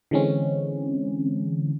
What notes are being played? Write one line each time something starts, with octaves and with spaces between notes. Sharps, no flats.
D3 E3 G#3 C4 C#4